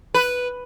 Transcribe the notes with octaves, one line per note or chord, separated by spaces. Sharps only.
B4